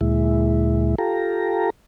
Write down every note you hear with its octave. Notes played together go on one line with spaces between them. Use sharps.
D2 A#2 G#3 E4
F4 G4 A4 A#5